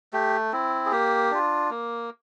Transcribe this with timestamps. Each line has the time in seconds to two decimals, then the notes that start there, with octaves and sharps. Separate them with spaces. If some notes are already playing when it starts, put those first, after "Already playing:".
0.13 A3 G4
0.52 C4 E4
0.86 G#4
0.91 A#3 G4
1.31 D4 F4
1.71 A#3